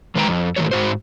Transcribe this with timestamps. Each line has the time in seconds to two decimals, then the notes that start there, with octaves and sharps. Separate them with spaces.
0.15 D#3 G#3 B4 F5 G5 A#5
0.27 F2
0.56 A2 D#3 E3 F#3 C#5
0.71 G#2 F#4 C5